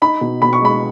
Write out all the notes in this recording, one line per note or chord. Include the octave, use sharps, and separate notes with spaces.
D#4 B5
B2
B2 B5
C#6
G#3 B5